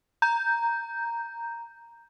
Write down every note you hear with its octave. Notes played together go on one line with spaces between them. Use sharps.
A#5 G6